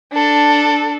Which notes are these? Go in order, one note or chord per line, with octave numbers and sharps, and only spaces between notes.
D4 A4